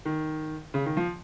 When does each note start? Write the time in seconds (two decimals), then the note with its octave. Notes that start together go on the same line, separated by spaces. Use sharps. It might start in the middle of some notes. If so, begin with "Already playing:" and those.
0.05 D#3
0.74 C#3
0.86 D#3
0.97 F3